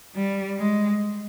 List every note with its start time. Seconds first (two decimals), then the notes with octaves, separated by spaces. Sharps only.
0.15 G3
0.58 G#3